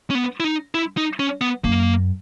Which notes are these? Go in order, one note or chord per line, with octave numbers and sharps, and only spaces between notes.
C#4
B3
E4
D#4
E4
D#4
C#4
B3
F#2 A#3